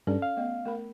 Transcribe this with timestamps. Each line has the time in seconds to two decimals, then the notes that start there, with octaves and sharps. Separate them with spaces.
0.07 G2 C#4 A4 D5
0.22 F5
0.37 A3 B3 D#5
0.65 A3 A#4 B5